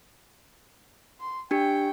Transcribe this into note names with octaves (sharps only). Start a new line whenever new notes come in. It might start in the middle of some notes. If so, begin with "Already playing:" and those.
C6
D4 G4 G5 C#7